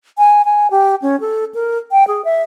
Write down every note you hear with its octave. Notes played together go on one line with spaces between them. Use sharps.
G#5
G#5
G4
C#4
A4
A#4
G5
G#4
E5